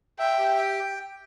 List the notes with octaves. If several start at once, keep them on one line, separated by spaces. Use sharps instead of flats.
E5 G5
G4
G5